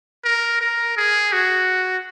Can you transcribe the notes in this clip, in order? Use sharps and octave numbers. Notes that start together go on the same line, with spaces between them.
A#4
A#4
G#4
F#4